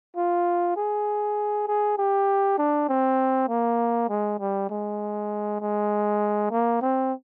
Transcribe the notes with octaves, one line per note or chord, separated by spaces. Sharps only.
F4
G#4
G#4
G4
D4
C4
A#3
G#3
G3
G#3
G#3
A#3
C4